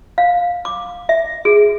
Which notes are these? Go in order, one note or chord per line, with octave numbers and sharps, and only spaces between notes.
F5
D6
E5
G#4